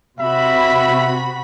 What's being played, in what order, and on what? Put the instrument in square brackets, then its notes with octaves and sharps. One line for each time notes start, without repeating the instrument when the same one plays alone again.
[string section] C3 F#4 B5 [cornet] E5